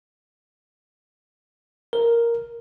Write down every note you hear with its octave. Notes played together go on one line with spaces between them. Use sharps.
A#4